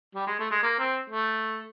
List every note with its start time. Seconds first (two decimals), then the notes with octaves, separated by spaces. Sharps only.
0.15 G3
0.27 G#3
0.39 A3
0.51 G#3
0.63 A#3
0.79 C4
1.10 A3